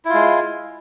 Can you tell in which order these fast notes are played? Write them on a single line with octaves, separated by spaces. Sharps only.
E4 F4 G#3